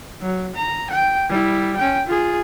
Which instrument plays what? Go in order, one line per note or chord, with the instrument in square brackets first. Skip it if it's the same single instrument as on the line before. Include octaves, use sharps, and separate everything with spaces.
[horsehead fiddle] F#3
A#5
G5
G3 E4
C#4 G5
F4 G#4